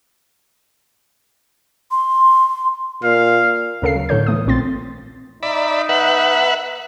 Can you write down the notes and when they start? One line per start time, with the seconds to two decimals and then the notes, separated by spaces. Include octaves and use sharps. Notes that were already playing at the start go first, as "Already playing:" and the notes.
1.91 C6
3.03 A#2 F5
3.82 D2 C#3 A4 A#4 F5 C7
3.96 F#3
4.09 A2 D3 A4 C#5 G6
4.27 E3 A3 D#6
4.47 A#1 A#2 C4 C6 A6
5.43 D#4 D5 E5 B5
5.89 B4 E5 F#5